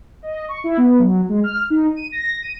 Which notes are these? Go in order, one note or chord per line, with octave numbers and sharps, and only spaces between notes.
D#5
C#6
E4
B3
F#3
G#3
F6
D#4
D#7
A#6
D#7